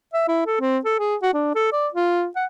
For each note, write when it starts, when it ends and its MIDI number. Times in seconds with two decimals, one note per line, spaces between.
0.13 0.23 76
0.28 0.43 64
0.46 0.60 69
0.61 0.78 60
0.85 0.95 69
0.99 1.16 68
1.22 1.31 66
1.34 1.52 62
1.55 1.68 69
1.72 1.88 74
1.94 2.27 65
2.36 2.46 78